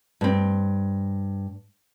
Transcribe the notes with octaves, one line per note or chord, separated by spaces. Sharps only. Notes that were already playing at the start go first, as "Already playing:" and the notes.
G2 C4